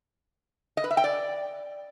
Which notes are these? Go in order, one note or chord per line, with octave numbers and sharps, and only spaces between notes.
D#5
B4
E5
G5
D5